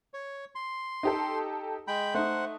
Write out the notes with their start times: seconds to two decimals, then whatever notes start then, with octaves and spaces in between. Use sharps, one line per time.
0.14 C#5
0.55 C6
1.03 D#4 G4 A4
1.88 G#3 G5 B5
2.15 A3 D#4 C5 F#5